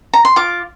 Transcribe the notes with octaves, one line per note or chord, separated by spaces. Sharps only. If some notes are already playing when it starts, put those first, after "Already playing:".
A#5
C6
F4 D6